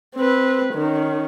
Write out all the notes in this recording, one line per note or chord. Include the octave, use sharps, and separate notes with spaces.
C4 B4
D#3 C#4